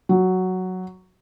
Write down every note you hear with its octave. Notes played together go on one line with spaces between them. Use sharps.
F#3